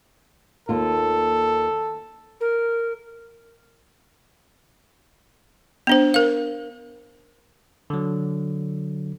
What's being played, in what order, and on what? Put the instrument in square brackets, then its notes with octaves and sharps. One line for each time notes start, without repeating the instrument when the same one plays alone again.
[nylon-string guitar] D#2 A#3 F4 [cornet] A4
[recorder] A#4
[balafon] B3 D4 C5
A#4 F5
[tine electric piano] D3 F#3